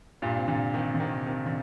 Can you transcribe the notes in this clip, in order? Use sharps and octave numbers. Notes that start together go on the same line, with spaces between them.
G2 A#2
C3
A#2 D3
C3 D#3
D3
C3 D#3
C3 D#3
D3